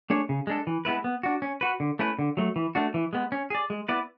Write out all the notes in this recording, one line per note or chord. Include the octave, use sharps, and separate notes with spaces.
A3 D4 G#4 C#5
C#3
G#3 D4 A4
E3
G#3 B3 E4 B4
B3
D4 F#4
C#4
F#4 B4
D3
A3 C#4 E4 B4
D3
F#3 A3
E3
A3 D4 F#4
E3
G#3 B3
C#4
G#4 D5
G#3
B3 E4 B4 D5